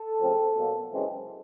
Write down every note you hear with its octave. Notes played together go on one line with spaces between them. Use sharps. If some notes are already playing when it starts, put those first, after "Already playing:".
Already playing: A4
C#3 F3 A3 C4
B2 F#3 A#3
F#2 C#3 E3 G#3 C4